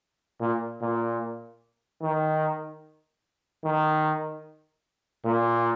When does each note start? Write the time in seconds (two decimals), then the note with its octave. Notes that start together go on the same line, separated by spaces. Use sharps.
0.40 A#2
0.81 A#2
2.02 D#3
3.64 D#3
5.25 A#2